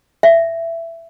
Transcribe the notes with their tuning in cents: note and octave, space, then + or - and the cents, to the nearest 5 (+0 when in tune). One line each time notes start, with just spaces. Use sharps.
E5 +15